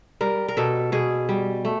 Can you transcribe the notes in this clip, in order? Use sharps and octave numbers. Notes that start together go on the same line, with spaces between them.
G3 A#4
A#4
B2 A4
B2 G#4
G3
A3